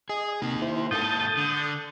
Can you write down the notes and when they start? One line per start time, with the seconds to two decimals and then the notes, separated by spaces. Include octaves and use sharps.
0.09 G#4 D#5
0.42 C3 A#3 D#4
0.62 E4 C5
0.91 G#2 A#3 A4 D#6 G6 A6
1.37 D3